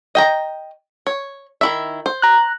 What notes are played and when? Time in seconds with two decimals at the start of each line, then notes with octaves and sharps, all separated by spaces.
0.15 D#5 G5 A#5
1.07 C#5
1.61 D#3 E4 E5
2.06 C5
2.22 A#5 F#6